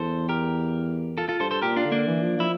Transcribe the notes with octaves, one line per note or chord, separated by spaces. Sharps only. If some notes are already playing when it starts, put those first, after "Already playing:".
Already playing: E2 A4 C5
G4 A#4
F4 A4
F4 A4
G2 A4 C5
A4 C5
A#2 G4 A#4
D4 F4
D3
A#3 D4
E3
F3
F3 E4